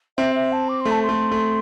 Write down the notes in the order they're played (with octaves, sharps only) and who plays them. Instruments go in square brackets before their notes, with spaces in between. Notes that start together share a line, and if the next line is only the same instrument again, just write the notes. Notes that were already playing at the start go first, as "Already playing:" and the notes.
[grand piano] C4 [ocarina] E5
[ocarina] E5
A5
D6
C6
[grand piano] A3
[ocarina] A5
C6
[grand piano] A3
A3